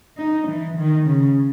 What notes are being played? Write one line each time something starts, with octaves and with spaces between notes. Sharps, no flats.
D#4
E3
D#3
C#3